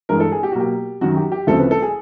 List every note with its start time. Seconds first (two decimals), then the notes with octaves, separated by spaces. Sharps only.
0.09 G2 E3 G#3 A#4
0.20 A4
0.32 G#4
0.43 G4
0.52 F#4
0.55 B2 F#3 A#3 G4
1.01 F#2 D#3 F#3 F#4
1.17 G4
1.32 G4
1.47 D2 C#3 F3 A3 C4 A4
1.59 B4
1.71 A4
1.82 G#4